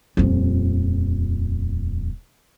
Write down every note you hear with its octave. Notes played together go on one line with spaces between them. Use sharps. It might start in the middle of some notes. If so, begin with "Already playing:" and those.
D#1 F2